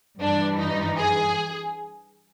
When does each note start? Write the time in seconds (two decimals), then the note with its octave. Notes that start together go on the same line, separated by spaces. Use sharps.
0.20 G2 E3 D4
0.59 D#4
0.99 G#4